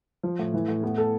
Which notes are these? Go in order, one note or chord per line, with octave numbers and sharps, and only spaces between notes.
F3
A2
E3
A2
B3
A4